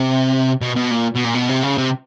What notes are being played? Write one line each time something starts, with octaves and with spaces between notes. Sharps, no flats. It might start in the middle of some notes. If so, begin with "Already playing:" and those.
Already playing: C3
B2
B2
A#2
B2
A#2
B2
C3
C#3
C3